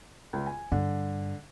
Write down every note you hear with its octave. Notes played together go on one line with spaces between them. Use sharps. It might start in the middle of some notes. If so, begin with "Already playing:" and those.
C#2
G#5
G2 D3